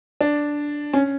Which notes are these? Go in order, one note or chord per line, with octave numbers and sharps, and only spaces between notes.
D4
C#4